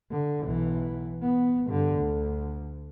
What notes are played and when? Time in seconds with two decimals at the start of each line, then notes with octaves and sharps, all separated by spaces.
0.11 D3
0.43 B1 E3
1.23 B3
1.67 G2 D3
1.98 D2